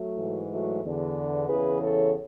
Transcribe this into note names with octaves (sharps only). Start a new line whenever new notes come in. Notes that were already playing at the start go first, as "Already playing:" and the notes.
Already playing: F#3 A3
G#2 E3
F#3 A3
E2 D3
E2 C#3 E3 G#4 B4
A4 C#5